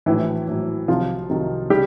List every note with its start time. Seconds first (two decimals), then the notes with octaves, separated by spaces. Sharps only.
0.06 A#1 A2 E3 F#3 E4
0.47 A#1 A2 F#3
0.88 C2 C3 D#3 F3 F#3 F4
1.30 C2 C3 D#3 F#3
1.70 C#3 G3 G4